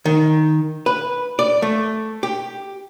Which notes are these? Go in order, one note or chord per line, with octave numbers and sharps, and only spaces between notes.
D#3
B4
D5
A3
G4